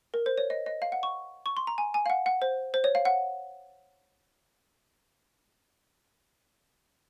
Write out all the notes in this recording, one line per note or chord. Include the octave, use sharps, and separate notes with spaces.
A#4
C5
C#5
D#5
D#5
F5
F#5
C#6
C#6
C6
A#5
G#5
G#5
F5
F#5
F#5
C5
C5
C#5
F5
F#5